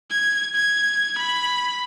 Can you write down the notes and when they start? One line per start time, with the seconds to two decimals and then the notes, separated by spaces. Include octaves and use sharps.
0.10 G#6
0.55 G#6
1.18 B5